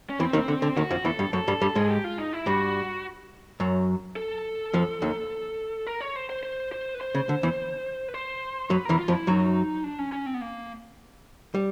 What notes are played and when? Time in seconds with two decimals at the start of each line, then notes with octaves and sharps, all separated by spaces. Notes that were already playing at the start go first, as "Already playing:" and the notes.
0.10 C#4
0.20 E2 E3 C4
0.33 D#2 D#3
0.48 D3
0.62 D3
0.77 D#2 D#3 F#4
0.91 F2 F3
1.04 E2 E3 A4
1.19 G2 G3
1.33 F#2 F#3 A4
1.48 G2 G3
1.61 G2 G3
1.75 G#2 G#3 G#4
1.90 G4
2.04 F4
2.19 D#4
2.33 E4
2.46 G2 G3 F#4
3.60 F#2 F#3
4.16 A4
4.73 F2 F3
5.02 D#2 D#3
5.87 A#4
6.01 C#5
6.16 C5
6.30 C5
6.43 C5
6.72 C5
6.95 B4
7.01 C5
7.15 C#3
7.29 D3
7.43 E2 E3
8.08 B4
8.14 C5
8.70 F#2 F#3 B4
8.85 E2 E3 A#4
8.99 F4
9.08 F2 F3
9.13 E4
9.27 F#2 F#3 D#4
9.84 D4
9.99 C#4
10.12 C#4
10.26 C4
10.34 B3
10.41 A#3
11.55 G3